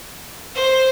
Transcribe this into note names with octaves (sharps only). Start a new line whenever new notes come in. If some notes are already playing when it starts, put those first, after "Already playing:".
C5